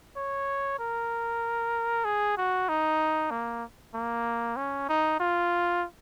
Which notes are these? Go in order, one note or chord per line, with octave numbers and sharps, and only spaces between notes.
C#5
A#4
G#4
F#4
D#4
A#3
A#3
C#4
D#4
F4